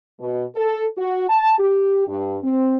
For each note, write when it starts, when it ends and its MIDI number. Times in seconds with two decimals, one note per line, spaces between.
0.20 0.44 47
0.56 0.86 69
0.97 1.28 66
1.29 1.55 81
1.58 2.04 67
2.08 2.37 43
2.43 2.78 60